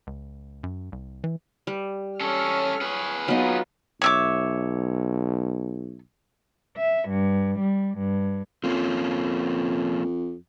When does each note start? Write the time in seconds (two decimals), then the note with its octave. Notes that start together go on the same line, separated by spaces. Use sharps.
0.07 C#2
0.63 F#2
0.92 C2
1.24 E3
1.67 G3
2.21 C#4 A4 C#5 F6
2.81 G#4 B4
3.28 F#3 B3 D#4 F4 D#5
4.02 B1 C#5 E5 D6
6.76 E5
7.09 G2
7.59 G3
7.98 G2
8.64 F2 F3 A#3 C#4